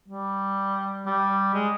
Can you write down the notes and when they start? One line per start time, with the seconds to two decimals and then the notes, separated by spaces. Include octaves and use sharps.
0.08 G3
1.06 G3
1.54 G#3